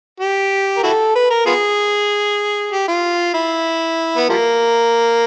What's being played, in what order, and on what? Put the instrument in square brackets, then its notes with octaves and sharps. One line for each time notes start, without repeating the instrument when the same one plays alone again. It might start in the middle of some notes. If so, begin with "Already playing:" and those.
[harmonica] G4
A#4
E4 F#4 A4
B4
A#4
B3 F4 G#4
G4
F4
E4
B3
F3 G3 A#3